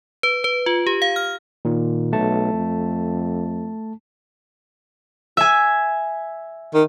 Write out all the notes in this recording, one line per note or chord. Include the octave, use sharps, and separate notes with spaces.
B4
B4
F4
G4
F5
F6
A#2 D#3
B1 A3 A5
F2
E5 G#5
D#3